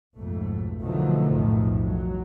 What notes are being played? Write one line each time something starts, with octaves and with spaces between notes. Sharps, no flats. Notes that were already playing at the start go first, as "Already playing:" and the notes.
B1 F2 G#2 A3
B2 D3 D#3 F3 F#3 A3
B1 F2 A2 D#3 F3
F#3